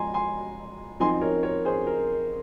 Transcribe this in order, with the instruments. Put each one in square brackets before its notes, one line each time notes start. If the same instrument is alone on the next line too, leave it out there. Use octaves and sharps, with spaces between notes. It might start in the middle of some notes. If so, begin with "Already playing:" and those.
Already playing: [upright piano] F3 G#3 G#5 A#5 C6
G#5 C6
F3 C4 D#4 G#5 C6
A#4 C#5
A#4 C#5
G#4 C5
A#4